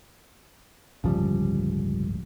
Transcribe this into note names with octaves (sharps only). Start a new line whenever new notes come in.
D1 G1 C#2 C#3 F3 G3